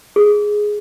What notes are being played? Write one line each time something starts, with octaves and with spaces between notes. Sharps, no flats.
G#4